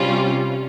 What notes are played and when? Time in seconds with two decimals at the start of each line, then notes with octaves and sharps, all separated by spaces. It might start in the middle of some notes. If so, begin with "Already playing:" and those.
Already playing: C3 G3 C#4 F4